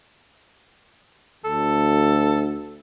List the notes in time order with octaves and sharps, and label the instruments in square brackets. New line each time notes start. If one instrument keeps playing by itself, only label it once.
[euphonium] D2 [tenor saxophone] A4